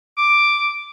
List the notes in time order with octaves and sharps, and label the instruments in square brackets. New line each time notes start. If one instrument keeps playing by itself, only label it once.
[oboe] D6